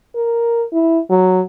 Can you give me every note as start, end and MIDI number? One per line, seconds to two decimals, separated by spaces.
0.15 0.65 70
0.72 1.01 64
1.10 1.42 54